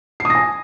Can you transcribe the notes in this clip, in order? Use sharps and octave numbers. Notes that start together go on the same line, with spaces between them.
C7
D#6
A#6
G#5